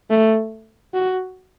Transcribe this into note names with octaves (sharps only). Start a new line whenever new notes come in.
A3
F#4